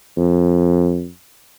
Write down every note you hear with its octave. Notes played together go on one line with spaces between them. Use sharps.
F2